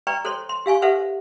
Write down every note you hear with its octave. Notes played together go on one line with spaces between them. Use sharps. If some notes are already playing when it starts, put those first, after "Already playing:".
B4 D5 G5 A#5 C#6
A4 C5 C#5 C6
C6
G4 F5 G#5 C#6
G4 A4 B4 C5 E5 F#5